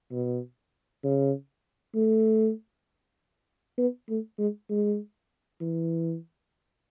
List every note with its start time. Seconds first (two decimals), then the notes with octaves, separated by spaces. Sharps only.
0.12 B2
1.04 C#3
1.95 A3
3.78 B3
4.09 A3
4.39 G#3
4.70 G#3
5.61 E3